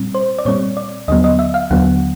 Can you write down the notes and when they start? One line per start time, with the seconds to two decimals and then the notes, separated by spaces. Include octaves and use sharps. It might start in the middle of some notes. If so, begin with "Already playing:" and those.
Already playing: A#2 G3 C4
0.15 C5
0.39 D5
0.45 A#2 G3 C4 C#5
0.77 D5
1.08 D#2 D3 F#3 B3 D#5
1.24 D#5
1.39 E5
1.54 F5
1.70 D#2 D3 F#3 B3 F#5